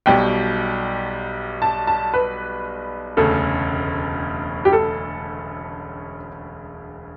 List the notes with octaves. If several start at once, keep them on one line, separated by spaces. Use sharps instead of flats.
B1 B2 G3 G5
A5
A5
B4
E1 D2 C#3 A4
G4
A4